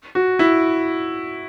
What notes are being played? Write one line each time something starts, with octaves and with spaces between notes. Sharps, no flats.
F#4
E4